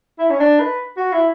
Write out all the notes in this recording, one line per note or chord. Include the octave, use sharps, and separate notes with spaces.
E4
C#4
D4
B4
F#4
E4